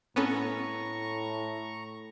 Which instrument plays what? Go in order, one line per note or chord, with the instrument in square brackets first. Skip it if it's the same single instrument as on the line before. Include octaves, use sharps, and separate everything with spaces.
[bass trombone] A2 [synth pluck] B3 C#4 A4 [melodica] A#5 C#6